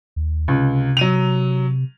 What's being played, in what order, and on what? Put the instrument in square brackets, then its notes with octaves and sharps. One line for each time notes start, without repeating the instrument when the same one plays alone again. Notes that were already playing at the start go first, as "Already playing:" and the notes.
[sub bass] D#2
[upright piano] C#2 [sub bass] C3
[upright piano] F#3 D#7 F7